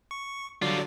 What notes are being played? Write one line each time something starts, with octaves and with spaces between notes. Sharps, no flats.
C#6
D3 F#3 G3 F4 D5